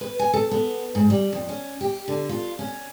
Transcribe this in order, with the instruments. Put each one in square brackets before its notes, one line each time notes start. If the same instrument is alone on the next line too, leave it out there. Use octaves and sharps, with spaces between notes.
[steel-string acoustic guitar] B4
G#5
A4
B3
G#2
G3
F2
C#4
G4
D3
F4
C#4